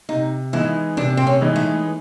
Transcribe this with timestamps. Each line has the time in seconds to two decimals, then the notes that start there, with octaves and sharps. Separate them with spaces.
0.09 C3 D#4
0.53 E3 G#3 B3 D#4 E4
0.97 C3 D4
1.17 C4
1.27 C#4
1.41 E3 G#3 B3 D#4
1.56 A3